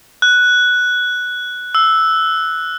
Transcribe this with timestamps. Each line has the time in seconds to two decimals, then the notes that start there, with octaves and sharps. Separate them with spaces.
0.22 F#6
1.75 E6